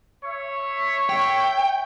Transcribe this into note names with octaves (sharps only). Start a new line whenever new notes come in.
C#5 E5
G5